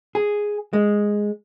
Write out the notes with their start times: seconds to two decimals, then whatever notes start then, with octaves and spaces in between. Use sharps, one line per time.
0.15 G#4
0.73 G#3